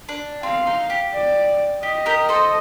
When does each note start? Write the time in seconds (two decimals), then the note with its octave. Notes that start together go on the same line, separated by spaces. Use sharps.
0.09 D4
0.43 C4 F5
0.67 D#4
0.90 G4
1.13 D5
1.83 G4 D#5
2.06 G4 A#4
2.29 A4 C5